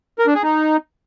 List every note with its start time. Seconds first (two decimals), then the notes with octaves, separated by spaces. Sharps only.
0.19 A#4
0.27 D4
0.35 G#4
0.42 D#4